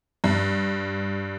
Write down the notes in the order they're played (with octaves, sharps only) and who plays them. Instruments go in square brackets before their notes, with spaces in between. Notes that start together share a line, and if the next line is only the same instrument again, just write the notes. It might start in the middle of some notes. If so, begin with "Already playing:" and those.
[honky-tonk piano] G2